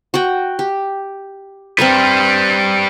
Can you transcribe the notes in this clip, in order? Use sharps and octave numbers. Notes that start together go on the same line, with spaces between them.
F#4 F#5 G5
G4
G3 C4 A#4 B4 E5